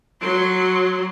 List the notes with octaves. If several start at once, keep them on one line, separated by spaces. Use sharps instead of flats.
F#3 C6